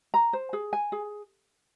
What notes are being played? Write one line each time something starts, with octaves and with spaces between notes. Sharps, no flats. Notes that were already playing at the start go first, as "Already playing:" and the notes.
A#5
C5
G#4
G#5
G#4